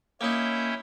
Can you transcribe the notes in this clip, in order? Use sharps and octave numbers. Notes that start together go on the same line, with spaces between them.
A#3 C#4 D#4 E4 G5